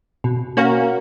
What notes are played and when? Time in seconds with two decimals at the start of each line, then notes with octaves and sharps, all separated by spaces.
0.24 B2
0.57 A#3 C#4 F#4 A#4